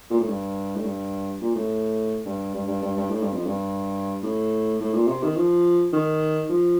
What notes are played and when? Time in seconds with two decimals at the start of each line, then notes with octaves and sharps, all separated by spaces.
0.10 A#2
0.20 A2
0.29 G2
0.76 A2
0.85 G2
1.41 A#2
1.55 A2
2.25 G2
2.54 G2
2.68 G2
2.82 G2
2.97 G2
3.10 A2
3.22 G2
3.33 F2
3.46 G2
4.23 A2
4.80 A2
4.94 A#2
5.08 C3
5.23 D#3
5.36 F3
5.93 D#3
6.49 F3